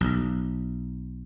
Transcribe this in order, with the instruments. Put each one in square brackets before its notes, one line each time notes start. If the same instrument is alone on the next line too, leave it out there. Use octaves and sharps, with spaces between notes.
[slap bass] B1